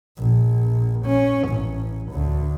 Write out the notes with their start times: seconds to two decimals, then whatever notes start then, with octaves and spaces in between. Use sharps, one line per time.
0.18 A#1
1.06 C#4
1.49 A1
2.12 D2